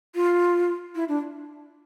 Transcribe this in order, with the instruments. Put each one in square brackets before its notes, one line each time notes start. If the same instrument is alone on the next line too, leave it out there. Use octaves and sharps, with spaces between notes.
[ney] F4
E4
D4